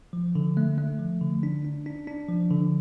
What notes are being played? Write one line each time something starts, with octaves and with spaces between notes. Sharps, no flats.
F3
D3
A3
A3
F3
D3
D4
D4
D4
D4
F3
D3